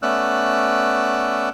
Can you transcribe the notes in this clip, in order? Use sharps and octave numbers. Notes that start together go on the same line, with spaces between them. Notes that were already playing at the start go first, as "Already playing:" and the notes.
A3 B3 C#4 D5 E6 F#6